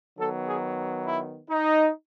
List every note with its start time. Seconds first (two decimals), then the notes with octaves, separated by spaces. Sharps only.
0.18 D#3 F#3 B3 A4
0.47 G#4
1.06 E4
1.49 D#4